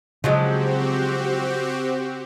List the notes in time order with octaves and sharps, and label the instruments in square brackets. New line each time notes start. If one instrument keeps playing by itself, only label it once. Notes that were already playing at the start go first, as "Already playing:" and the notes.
[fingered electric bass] C#3 [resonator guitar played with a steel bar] F3 F#3 G#3 [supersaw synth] C4 F#4 G4